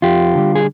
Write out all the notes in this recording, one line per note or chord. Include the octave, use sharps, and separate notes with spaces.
F2 F4 G4
D3 G3
G#4